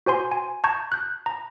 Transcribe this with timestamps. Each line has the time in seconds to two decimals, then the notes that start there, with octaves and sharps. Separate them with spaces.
0.06 F#4 C5 G#5 C6
0.32 G#5
0.64 A5 A#5 C#6 G6 G#6
0.92 F#6 G6
1.26 A#5